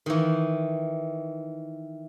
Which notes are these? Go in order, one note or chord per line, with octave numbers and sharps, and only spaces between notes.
D#3 E3